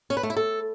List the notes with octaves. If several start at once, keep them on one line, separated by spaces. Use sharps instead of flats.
C#4
B4
A3
E4
A4